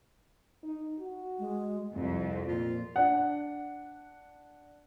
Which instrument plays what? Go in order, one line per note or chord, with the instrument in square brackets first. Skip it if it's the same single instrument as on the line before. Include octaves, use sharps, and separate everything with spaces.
[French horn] D#4
F#4
[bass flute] G#3
[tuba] C2 [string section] F2
[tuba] A#2 [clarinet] F4
[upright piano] D4 F#5